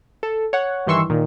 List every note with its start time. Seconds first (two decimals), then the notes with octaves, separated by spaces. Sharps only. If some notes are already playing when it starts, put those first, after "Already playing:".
0.23 A4
0.53 C#5 F#5
0.87 G2 D#3 E3 C6 C#6 E6
1.10 A#2 D#3